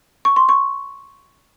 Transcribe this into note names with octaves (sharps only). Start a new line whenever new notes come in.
C#6
C6
C#6